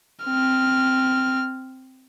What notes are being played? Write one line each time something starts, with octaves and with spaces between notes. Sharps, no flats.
C4 F6